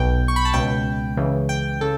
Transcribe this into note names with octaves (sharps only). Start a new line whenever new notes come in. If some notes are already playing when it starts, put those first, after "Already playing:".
Already playing: B1 B2 G5
C#6
B5
A5
C#2 B2 G5
C#2 C#3 E3
G5
C#3 A4